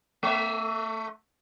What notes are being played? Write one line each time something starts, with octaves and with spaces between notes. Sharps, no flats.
A3 E5